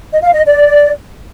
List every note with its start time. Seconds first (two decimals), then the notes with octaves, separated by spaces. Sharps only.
0.12 D#5
0.23 F5
0.33 D#5
0.44 D5